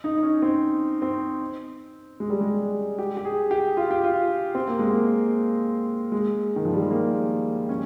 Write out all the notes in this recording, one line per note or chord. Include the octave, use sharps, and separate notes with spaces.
D#4
D#4
C#4
C4
C4
G#3
G3
G#3
G4
G4
G#4
G4
F4
G4
F4
C4
A#3
G#3
A#3
G#3
D#3
F3
G3
G#3
A#3
C#4